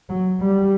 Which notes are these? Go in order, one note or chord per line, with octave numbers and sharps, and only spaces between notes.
F#3
G3